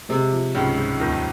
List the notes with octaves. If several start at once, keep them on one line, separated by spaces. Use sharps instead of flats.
C3 G#3
F3
C#2 G#2 C#3
G#2
D#2 D#3 F3